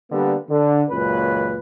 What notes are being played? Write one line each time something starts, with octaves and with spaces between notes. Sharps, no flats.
D3 G3 A#3 B3
D3
C#2 F#2 A#2 C#4 B4